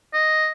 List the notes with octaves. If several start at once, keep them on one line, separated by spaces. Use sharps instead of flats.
D#5